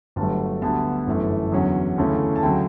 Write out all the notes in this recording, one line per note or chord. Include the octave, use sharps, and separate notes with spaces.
G1 G2 F#3 A3 A5
D2 D3 G3 B3 A5
G1 F#2 E3 A3
E2 D3 F#3 C#4
D2 C#3 E3 A3 C#4
A5
D2 C#3 F#3 G5